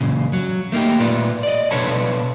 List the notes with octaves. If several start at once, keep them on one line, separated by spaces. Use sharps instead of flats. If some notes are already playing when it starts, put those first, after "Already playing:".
F#2 A#2 C#3
F#3
A3 A#3 D#4 G4
A#2 A3 F4 B4 D5
D5 D#5
B2 D4 A4 B4 C#5 A5